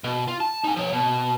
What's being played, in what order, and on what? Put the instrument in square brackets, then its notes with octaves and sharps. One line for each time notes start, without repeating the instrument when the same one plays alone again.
[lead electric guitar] B2
F4
A5
D#4 G#5
F3 C#5
B2